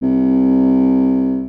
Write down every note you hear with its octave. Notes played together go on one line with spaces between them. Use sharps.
C2